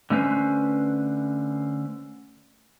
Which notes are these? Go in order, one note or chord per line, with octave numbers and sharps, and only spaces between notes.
D3 A3 C#4 B4 C5